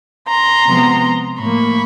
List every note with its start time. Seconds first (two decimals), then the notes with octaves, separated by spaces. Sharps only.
0.28 A#5 C6
0.66 C3 F3 G#3 B3
1.41 A2 F3 A#3 B5 C#6